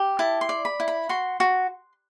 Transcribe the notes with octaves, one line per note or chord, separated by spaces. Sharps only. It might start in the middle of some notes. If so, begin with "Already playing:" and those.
Already playing: G4
E4 A5
C6
D5
B5
E4
B5
F#4 C6
F#4